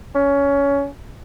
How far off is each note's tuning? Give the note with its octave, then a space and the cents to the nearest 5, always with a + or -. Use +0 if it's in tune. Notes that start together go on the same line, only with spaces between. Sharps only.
C#4 +20